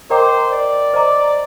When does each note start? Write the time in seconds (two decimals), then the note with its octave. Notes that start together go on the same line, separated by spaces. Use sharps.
0.10 A#4 C5 D#5 G5 A#5 D6
0.51 D5
0.94 C5 D#5 A#5 D6